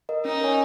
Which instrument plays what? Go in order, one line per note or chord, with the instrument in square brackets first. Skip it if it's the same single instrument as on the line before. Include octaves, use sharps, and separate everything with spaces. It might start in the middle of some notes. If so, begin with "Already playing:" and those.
[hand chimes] A#4 D#5
[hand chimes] C#4 [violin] D#4
[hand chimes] A#4 C#5 G#5